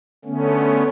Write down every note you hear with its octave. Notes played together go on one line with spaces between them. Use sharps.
D3 A3 B3 C#4